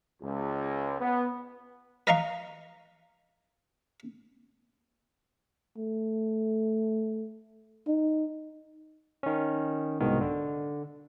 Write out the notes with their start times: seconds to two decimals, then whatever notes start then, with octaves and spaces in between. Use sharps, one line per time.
0.22 C#2
0.99 B3
2.07 B4 D#5 F5 A#5 C6 C#6
5.77 A3
7.87 D#4
9.23 D#3 C#4
10.00 C2 G#2 B2 D#3
10.21 D3